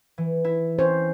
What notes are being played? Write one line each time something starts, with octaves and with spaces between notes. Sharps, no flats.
E3
E4
C#4 C5